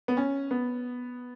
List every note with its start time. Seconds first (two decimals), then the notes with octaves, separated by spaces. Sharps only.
0.08 B3
0.17 C#4
0.51 B3